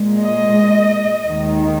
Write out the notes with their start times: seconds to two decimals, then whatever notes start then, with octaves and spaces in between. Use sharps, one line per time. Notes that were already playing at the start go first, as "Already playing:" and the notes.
Already playing: A#2 G#3
0.19 D#5
1.27 D#2 D#3 G#3